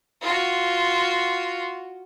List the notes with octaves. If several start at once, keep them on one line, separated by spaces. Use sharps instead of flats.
F4 F#4